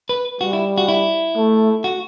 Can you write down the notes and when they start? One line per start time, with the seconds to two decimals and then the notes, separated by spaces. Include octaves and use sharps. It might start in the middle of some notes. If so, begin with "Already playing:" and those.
0.09 B4
0.41 G3 F#4
0.53 E4
0.78 F#4
0.88 E4
1.37 A3
1.84 F#4